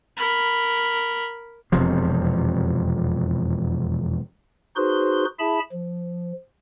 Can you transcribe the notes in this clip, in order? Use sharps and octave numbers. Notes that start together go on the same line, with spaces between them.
A#4 B5
E1 F2 C3 F3
D#4 F#4 G#4 B4 C5 C6
E4 G#4 E5 A5 B5
F3